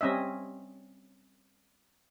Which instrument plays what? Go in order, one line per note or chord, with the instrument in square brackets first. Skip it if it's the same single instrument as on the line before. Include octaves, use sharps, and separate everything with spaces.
[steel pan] G3 C4 C#4 D#5 E5